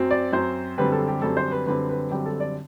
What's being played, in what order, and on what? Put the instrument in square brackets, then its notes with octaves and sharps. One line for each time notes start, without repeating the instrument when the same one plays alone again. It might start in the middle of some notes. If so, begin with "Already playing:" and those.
Already playing: [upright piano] F#2 F#3 C4
D5
F#2 F#3 C4 C5
F#2 D3 G3 C4 B4
A4
G4
F#2 D3 G3 C4 A4
C5
B4
F#2 D3 G3 C4 B4
B4
F#2 D3 G3 C4 G4
A4
D5